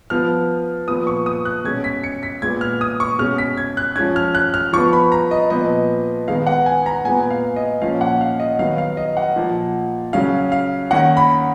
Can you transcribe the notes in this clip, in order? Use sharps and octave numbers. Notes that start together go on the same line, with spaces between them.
F3 B3 F6
A#2 F3 B3 D#6
C#6
D#6
F#6
B2 G#3 C#4 G#6
B6
C#7
B6
A#2 G#3 B3 G#6
F6
D#6
C#6
B2 G#3 C#4 F6
B6
G#6
F#6
F3 G#3 C#4 G#6
F6
F#6
F6
F3 B3 C#6
B5
A#5
D#5
A#2 F3 B3 D#5
D#3 G#3 B3 F5
F#5
G#5
A#5
A#2 G#3 B3 G#5
F5
D#5
A#2 F3 A#3 C#4 F5
F#5
F5
D#5
D#3 F#3 B3 F5
F5
D#5
F#5
A#2 F3 A#3
C#3 F#3 C#4 F5
F5
D#3 A#3 C#4 F#5
B5